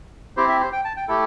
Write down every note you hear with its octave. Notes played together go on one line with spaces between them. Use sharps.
C4 E4 G4 C5
E5
C5
G5
A5
G5
A3 E4 G4 A4